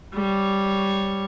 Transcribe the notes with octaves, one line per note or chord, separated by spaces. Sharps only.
G3 C#5